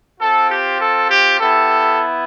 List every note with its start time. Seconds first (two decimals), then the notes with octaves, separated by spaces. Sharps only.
0.20 C4 F4 A4
0.51 G4
0.81 A4
1.10 G4
1.40 B3 E4 G4 A4